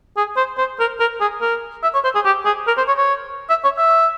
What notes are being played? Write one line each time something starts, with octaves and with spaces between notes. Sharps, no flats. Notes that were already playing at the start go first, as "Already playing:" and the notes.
G#4
C5
C5
A#4
A#4
G#4
A#4
E5
C#5
C5
G#4
G4
G#4
A#4
C5
C#5
C#5
E5
C#5
E5